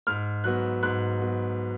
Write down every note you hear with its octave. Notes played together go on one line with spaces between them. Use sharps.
G#2 F6
F#3 B3 F#6
G#2 F#6
F#3 B3